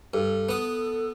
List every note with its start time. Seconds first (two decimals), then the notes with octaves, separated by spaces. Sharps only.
0.14 G2 A4
0.49 B3 D#6